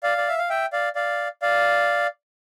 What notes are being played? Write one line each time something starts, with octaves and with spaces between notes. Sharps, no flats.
D5 F5
D5
E5
F5
E5 G5
D5 F5
D5 F5
D5 F5